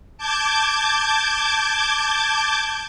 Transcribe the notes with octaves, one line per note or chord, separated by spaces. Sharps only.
A5 D6 G6 G#6